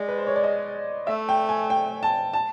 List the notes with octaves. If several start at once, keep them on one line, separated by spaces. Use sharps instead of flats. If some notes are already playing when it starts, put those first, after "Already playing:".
Already playing: G#3 D5
B4
C5
C#5
D5
D#5
A3 E5
G5
G#5
G5
A5
A5